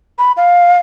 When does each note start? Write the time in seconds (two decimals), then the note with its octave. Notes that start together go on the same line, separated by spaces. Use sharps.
0.19 B5
0.37 F5